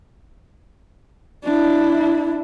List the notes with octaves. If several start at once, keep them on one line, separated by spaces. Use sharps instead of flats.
D4 E4